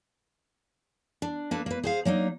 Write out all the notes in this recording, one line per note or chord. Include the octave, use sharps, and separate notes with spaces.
D4
A#3 D4 A4 B4
A#3 B4
G#4 C5 F5
F#3 A#3 D4 D#4